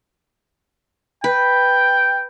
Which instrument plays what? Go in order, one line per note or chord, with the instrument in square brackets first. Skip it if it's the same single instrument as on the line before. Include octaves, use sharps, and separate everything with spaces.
[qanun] B4 [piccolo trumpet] G5